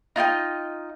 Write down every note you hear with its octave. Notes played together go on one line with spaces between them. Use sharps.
D#4 F4 D#5 G5